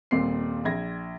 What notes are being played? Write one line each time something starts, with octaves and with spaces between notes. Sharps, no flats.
D#1 A#2 C4 C7
A#1 G#6 A#6